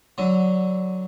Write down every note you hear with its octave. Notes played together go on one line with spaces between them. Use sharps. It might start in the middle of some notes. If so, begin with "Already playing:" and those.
D3 F#3